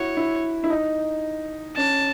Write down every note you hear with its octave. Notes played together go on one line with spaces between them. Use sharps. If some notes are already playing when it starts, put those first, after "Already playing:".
Already playing: E4 F#4 C#5
E4
E4
D#4
C#4 A5